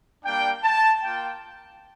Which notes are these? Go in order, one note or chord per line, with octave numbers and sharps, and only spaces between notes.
G3 A#3 D4 G5
A5
A#3 F4 G5